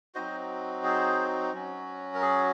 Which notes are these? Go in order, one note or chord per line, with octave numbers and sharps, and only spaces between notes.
F#3 C4 D#4 F#4 C5 D#5
G#4 C5
F#3 C#4 F#4
A#4
G#4